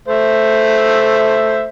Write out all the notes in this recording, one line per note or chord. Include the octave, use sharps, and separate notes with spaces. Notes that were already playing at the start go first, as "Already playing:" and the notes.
A3 C5 E5